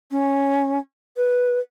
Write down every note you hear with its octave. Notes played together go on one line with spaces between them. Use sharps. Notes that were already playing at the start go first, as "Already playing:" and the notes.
C#4
B4